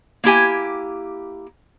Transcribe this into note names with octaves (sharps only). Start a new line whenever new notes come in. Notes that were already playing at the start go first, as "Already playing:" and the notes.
A#3 E4 G4 G#5